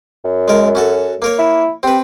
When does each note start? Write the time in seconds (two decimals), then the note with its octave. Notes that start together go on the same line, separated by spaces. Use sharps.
0.25 F#2
0.48 G#3 A#4
0.75 C#4 F#4 A4
1.22 A#3 A#4 C#5
1.38 E4
1.83 C4 G4 B4